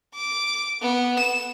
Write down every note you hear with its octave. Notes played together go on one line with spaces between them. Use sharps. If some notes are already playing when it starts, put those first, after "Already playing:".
D6
B3
E7